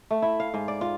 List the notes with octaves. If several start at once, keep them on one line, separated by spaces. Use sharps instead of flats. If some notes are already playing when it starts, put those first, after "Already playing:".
A3
E4
F5
G#2
D5
F4